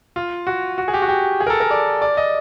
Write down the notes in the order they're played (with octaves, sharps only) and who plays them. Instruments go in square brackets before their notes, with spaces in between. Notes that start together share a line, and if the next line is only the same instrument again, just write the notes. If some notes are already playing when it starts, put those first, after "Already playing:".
[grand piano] F4
F#4
F#4
G#4
G4
F#4
G4
G#4
A#4
A4
A#4
D5
D5
D#5